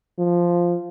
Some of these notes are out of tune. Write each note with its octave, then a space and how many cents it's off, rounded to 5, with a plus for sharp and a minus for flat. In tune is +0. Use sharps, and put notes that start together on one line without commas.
F3 +0